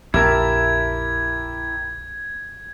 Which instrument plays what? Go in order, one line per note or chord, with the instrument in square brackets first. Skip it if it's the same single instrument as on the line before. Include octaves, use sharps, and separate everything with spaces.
[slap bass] A#1 F2 [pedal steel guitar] E4 E5 A5 [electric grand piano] G4 A#4 [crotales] G#6